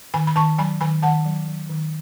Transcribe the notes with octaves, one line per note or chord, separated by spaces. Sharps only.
D#3 G#5 B5
B5
D#3 A5 C#6
F#3 G#5 B5
D#3 G#5 B5
D#3 F#5 A5
F#3
F#3
D#3